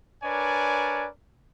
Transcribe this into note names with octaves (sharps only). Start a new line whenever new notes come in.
D4 A#4 B4 C#5 D5 G#5